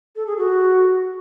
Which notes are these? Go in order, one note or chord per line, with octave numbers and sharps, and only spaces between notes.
A4
G#4
F#4